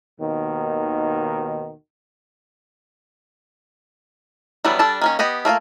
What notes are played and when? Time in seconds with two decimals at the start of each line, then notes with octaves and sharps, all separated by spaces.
0.21 D#2 B2 D#3
4.65 E3 F#3 G3 B3 D4
4.79 G3 D4 A4 A5
5.02 D#3 A#3 C#4
5.19 B3 G4 D#5 F#5
5.45 A3 A#3 F4 F5